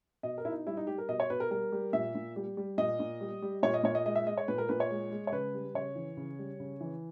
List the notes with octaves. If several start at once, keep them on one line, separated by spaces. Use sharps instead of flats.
B2 D#5
A#4
B2 E4
D#4
G3 E4
D#4
G3 G4
A#4
B2 D#5
C#5
B2 B4
A#4
G3 A#4
G3
A#2 E5
A#2
G3
G3
A#2 D#5
A#2
G3
G3
A#2 C#5
D#5
A#2 C#5
D#5
G#3 D#5
E5
G#3 D#5
C#5
A#2 B4
A#4
A#2 B4
C#5
G#3
G#3
C#5
C#3 B4
G3
C#3 C#5
E3
C#3
G3
C#3
E3